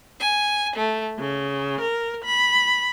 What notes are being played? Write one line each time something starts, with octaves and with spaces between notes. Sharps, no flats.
G#5
A3
C#3
A#4
B5